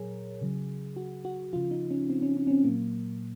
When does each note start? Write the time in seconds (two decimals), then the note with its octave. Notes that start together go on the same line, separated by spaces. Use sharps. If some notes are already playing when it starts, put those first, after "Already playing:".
Already playing: A#2 F#3 G#4 A#4 C#5
0.41 C#3 F#3
0.96 F#4
1.25 F#4
1.53 C#3 F3 F4
1.71 D#4
1.91 C#4
2.10 C4
2.22 C#4
2.37 C#4
2.47 C#4
2.51 C4
2.64 A#2 F#3 A#3